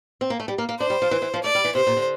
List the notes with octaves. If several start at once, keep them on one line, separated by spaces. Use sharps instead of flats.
C4
A#3
A3
G3
A#3
A#3
D4 C5
G3
F3
E3
E3
F3
A3 D5
G3
E3
C3 C5
A#2
D3